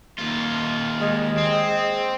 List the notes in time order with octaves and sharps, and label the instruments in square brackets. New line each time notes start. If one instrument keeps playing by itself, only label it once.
[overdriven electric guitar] D#2 F4
[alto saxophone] G#3
[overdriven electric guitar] C4